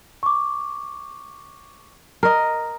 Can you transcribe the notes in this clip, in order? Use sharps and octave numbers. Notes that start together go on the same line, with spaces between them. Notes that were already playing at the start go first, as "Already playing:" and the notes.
C#6 D6
A#4 D#5